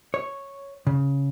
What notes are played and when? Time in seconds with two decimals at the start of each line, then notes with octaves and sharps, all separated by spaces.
0.14 C#5
0.87 C#3